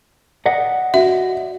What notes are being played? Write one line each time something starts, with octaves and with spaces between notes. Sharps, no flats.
D5 D#5 F#5
F#4 E5